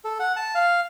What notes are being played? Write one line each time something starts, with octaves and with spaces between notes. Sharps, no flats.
A4
F#5
A5
F5